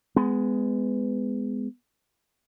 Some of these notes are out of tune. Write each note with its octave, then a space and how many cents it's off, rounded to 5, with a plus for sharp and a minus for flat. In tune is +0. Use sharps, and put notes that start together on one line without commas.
G#3 +0 B3 +25